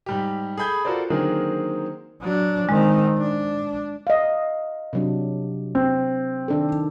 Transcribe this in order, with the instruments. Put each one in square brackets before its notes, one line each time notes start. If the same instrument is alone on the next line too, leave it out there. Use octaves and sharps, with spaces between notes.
[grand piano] G#2 G3 G4
G#4 A4 B5 G6 G#6
F4 F#4 A4 A#4 C5 D5
D3 D#3 F#3 A#3 C4 G#4
[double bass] F#3 D4
[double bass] D#3 C4 [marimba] G#3
[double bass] D4
[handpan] D#5 F5
C3 F#3 D4
[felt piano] C4
[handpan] D#3 D4 A4